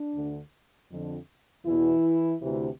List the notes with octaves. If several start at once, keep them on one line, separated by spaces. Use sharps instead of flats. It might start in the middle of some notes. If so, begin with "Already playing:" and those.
Already playing: D4
D2 D3
F2 D3
E2 B2 E3 E4
D2 C3 E3